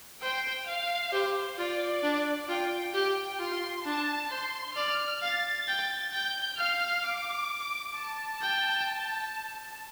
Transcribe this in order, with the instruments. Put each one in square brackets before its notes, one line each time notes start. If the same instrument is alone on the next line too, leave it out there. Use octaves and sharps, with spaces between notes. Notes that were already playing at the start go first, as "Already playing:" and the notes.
[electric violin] C5 [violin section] G5
[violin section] F5
[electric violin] G4 [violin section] C5
[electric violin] F4 [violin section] D5
[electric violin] D4
[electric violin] F4 [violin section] G5
[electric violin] G4 [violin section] G5
[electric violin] F4 [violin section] C6
[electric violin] D4 [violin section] A5
[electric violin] C5 [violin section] C6
[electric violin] D5 [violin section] F6
[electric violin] F5 [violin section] A6
[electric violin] G5
[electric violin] G5 [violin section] G6
[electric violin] F5 [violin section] F6
[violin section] D6
A5
[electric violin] G5